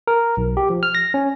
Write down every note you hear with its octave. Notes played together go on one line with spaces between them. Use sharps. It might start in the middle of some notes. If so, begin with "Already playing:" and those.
A#4
B1
G4
F3
F6
A#6
C#4